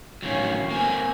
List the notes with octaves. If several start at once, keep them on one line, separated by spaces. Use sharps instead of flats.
A2 D#3 F#3 C#4 F5
A#3 C4 G#5